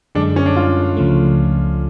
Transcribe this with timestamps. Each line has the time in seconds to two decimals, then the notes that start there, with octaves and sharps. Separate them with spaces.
0.15 F#2 D3 G#3 D4
0.36 C#4
0.46 D4
0.56 F4
0.97 C#2 C#3 F3 A3